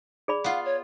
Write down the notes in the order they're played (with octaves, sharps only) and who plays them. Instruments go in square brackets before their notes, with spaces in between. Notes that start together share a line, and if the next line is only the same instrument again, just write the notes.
[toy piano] G#4 D5 B5
[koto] B3 F4 [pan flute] F5
[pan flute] C#5